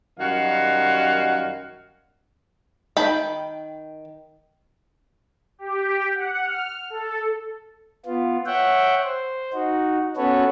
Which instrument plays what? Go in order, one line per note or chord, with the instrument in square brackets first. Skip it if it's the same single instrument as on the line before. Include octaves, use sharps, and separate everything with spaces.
[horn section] F#2 D#3 G3 F#4 F5
[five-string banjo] D#3 G5 A5 B5
[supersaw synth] G4
F#5
F6
A4
[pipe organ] B3 F4
C#5 E5 F#5 G5
C5
D#4 F#4
B3 C#4 F#4 A4 B4 C#5